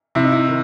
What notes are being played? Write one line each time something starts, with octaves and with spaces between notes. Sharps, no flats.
C3 E4
D#4
E4
D#3